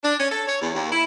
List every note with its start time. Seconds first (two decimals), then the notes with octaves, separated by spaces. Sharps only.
0.03 D4
0.18 C#4
0.30 A4
0.47 C#5
0.60 E2
0.73 D#2
0.91 E4